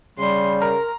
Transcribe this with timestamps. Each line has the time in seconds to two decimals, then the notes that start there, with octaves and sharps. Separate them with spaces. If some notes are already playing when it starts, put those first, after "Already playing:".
0.18 C#3 G3 C6
0.62 A#4 A#5